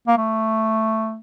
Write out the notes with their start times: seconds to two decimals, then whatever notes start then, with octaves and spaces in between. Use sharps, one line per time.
0.08 A#3
0.18 A3